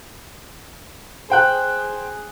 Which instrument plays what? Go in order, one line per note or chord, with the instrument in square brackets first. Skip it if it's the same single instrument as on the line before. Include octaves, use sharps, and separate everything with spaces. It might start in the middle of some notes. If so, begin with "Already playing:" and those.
[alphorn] G#4 [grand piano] C5 G5 F#6